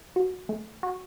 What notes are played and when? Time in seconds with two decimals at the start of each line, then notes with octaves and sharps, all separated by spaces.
0.16 F#4
0.49 A3
0.83 F#4